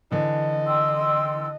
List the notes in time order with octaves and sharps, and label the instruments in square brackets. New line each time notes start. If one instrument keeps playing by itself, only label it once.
[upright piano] D3 E3 [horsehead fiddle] D#5
[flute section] G5 C6 E6